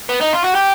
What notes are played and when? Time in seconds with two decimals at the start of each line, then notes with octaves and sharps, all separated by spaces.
0.09 B3
0.21 D#4
0.33 F4
0.44 F#4
0.55 G4